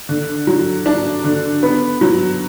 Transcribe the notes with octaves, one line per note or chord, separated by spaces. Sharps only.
D3
F#3
D4
D3
B3
F#3